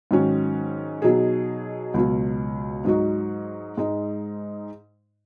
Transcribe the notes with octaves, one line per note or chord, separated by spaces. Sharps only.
G#2 D#3 F#3 C#4 F#4
B2 F#3 D#4 G#4
C#2 B2 F#3
G#2 F#3 D#4 F#4
G#2 G#3 D#4